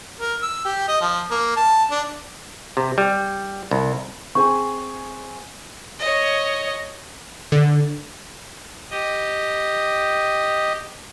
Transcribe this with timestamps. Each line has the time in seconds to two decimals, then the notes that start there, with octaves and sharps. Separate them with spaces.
0.19 A#4
0.42 E6
0.65 G4
0.88 D#5
1.01 F3
1.30 A#3
1.56 A5
1.91 D4
2.77 C3
2.98 G3
3.71 C2
4.35 C4 G#4 G#5 C#6
5.99 C#5 D#5
7.52 D3
8.91 G4 D#5